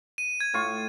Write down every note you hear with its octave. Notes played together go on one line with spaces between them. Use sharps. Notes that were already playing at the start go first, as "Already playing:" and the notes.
D#7
G#6
A2 F4 C#6